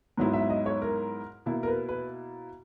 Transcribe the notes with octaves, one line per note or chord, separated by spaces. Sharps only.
G#2 F#3 B3 E4
E5
D#5
C#5
A#4
B2 A#3 E4
A#4
B4
B4